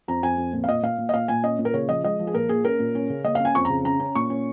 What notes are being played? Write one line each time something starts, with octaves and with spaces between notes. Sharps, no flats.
F2 A#5
F2 G#5
F2
A#2
F5
A#2 D#5
A#2 F5
A#2
D#5
A#2 F5
A#2 G#5
C#4 D#5
A#2
A#4
C#3 C#5
F3 D#5
G#3 D#5
F3
G#4
A#2 A#4
A#3 G#4
C#4 A#4
A#2
C#4
C#3
A#3 D#5
F5
C#4
G#5
F2 C#6
A#5
C#3
C#4 A#5
C#4
A#2 C#6
C#4